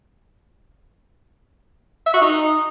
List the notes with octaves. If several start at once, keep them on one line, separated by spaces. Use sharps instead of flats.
E5
F#4
D#4